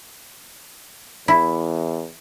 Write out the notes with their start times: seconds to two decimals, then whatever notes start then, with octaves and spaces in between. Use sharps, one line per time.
1.28 E2 E4